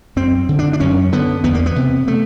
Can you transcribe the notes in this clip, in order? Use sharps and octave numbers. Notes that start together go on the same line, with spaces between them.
F#2 C4
D3
D4
D4
F#2 C#4
D3 B3
E2 B3
A#3
B3
C3
A3